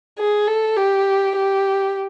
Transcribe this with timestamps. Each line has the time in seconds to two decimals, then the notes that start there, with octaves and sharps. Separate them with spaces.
0.18 G#4
0.47 A4
0.76 G4
1.35 G4